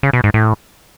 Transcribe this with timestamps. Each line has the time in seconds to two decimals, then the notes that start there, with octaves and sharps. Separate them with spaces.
0.03 C#3
0.13 B2
0.24 G#2
0.34 A2